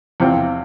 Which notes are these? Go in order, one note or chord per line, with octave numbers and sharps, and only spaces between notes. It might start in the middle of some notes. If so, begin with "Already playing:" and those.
E2 C3 F3 C4 F4